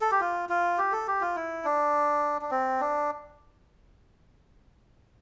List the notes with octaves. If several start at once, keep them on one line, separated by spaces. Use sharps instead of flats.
A4
G4
F4
F4
G4
A4
G4
F4
E4
D4
D4
C4
D4